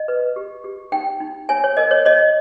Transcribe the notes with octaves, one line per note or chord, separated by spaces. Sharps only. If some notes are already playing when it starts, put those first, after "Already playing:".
Already playing: D#5
B4
G4
G4
D#4 G5
D#4
C#5 G#5
C#5
A#4 D#5
C#5
C#5 D#5